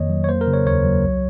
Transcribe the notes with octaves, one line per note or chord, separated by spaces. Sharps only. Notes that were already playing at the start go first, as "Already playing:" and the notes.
Already playing: F2 D#3 A#3 C#5 D#5
F#3
C#5
A#3 C5
A#4
C#3
C#5
D#2 C#5
F#3
C2